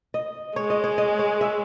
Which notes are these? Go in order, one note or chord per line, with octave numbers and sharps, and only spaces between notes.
D#5
G#3 C#5
D#5
C#5
D#5
C#5
E5